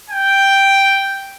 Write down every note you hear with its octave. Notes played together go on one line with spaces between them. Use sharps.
G5